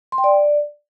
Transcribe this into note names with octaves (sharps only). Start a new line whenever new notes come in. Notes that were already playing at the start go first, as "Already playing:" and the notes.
C6
G5
D5